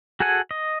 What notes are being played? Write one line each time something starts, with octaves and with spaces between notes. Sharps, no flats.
F#4 G#4 A4 F#5 G#5
D#5